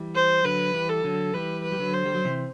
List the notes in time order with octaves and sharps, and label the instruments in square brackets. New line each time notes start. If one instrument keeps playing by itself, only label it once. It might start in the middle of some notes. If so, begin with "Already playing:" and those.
Already playing: [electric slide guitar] E3 G3
[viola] C5
[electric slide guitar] D3 F#3 [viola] B4
[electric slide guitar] E3 G3
[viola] A4
[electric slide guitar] D3 F#3
[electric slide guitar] E3 G3 [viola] B4
[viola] B4
[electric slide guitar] G3
D3 F#3
[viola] C5
[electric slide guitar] G3
F#3
C3 E3